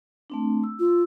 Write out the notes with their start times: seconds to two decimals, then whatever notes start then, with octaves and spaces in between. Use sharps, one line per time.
0.30 A3 C4 D4
0.64 E6
0.80 F4